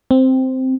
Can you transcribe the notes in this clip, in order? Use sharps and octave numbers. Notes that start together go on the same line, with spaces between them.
C4